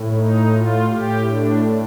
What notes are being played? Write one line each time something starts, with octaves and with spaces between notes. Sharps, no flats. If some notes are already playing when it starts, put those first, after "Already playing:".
Already playing: A2
D#4
F4
A2 G4
D4